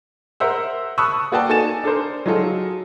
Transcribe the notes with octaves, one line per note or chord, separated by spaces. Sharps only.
A#4 C5 E5 F#5 E6
A5 B5 C#6 D#6 E6 F#6
A#3 F#4 B4 D5 G5 A5
D#4 A4 D5 G#5 A6 E7
D4 A4 A#4 C5
F#3 G#3 D#4 F4 A4